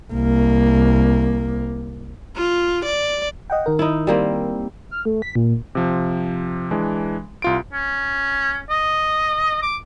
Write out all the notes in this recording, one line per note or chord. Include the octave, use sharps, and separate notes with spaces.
C2 A#3
F4
D5
D#5 F#5 G5
D#3 A#4
D#4 E4
G3 A#3 C4
F6
A3
B6
A#2
C3 F3
E3 G#3 D4
C2 F4 D7
C#4
D#5
D6